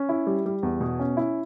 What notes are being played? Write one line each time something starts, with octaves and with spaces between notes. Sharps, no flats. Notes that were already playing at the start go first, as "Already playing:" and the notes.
Already playing: C#4
E4
G3
G3
E2
B2
C#4
E4